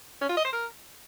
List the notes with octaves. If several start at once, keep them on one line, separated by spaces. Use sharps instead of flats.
C#4
F4
D#5
C5
A#4